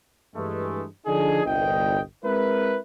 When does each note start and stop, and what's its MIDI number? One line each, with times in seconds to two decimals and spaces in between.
0.36 0.86 43
0.36 0.86 52
0.36 0.86 56
0.36 0.86 57
1.06 1.44 50
1.06 1.44 53
1.06 1.44 62
1.06 1.44 63
1.06 1.44 68
1.45 2.00 31
1.45 2.00 36
1.45 2.00 75
1.45 2.00 79
2.24 2.78 56
2.24 2.78 60
2.24 2.78 64
2.24 2.78 70
2.24 2.78 71